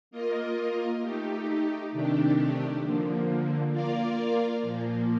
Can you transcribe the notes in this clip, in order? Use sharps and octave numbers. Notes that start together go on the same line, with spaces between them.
A#3 F4 A#4 D#5
A3 D#4 G4
C3 D#3 A3 D4 G4
D3 F3 A#3
A#3 F4 A#4 D5 F5
A#2 F3 A#3